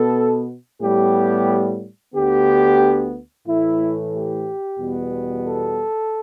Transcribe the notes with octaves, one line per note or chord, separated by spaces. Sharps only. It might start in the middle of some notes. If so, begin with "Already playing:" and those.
Already playing: B2 B3 A4
A2 G3 B3 G4
D2 D3 B3 G4
A2 E3 A3 E4
G4
E2 B2 G3 B3
A4